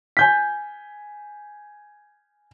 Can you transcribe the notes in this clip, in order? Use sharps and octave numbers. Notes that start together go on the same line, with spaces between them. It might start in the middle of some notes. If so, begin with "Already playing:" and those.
G#5 G6 B6